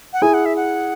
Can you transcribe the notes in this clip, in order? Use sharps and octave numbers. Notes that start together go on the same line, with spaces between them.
F#5
E4 G#4 G#5
F#5
E5
F#5